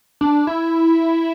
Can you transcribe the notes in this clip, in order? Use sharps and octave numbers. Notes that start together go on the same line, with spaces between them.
D4
E4